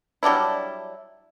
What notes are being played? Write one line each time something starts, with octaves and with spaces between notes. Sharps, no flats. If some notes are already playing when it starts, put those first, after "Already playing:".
F#3 G3 D4 E4